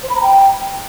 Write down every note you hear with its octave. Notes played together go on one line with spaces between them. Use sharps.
C5
B5
A#5
G5